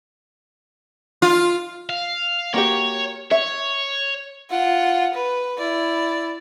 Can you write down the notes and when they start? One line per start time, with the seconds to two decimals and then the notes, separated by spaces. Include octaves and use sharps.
1.22 F4
1.89 F5
2.54 A#3 F#4 G4 C#5
3.31 C#5 E5
4.50 F4 F#5
5.14 B4
5.58 E4 D5